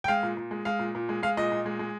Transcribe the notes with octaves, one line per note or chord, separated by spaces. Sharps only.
G5
G#3 F5
A#2
A#2
G#3
G#3 F5
A#2
A#2
G#3
G#3 F5
A#2 D#5
A#2
G#3
G#3